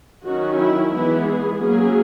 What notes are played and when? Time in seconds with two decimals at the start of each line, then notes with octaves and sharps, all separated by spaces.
0.24 D#3 F#3 C#4 F#4
0.58 E4
0.92 E3 G#3 B3 E4
1.26 G#4
1.60 F#3 A#3 C#4 G#4